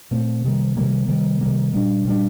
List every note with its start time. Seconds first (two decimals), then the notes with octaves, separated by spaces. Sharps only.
0.11 A#2 A3 C4
0.44 C3 D#3 G3 A#3
0.77 C3 D#3 G3 A#3
1.08 C3 D#3 G3 A#3
1.41 C3 D#3 G3 A#3
1.74 A#2 G3 D4
2.05 A#2 G3 D4